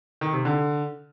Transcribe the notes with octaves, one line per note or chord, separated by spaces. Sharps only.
D#3
C3
D3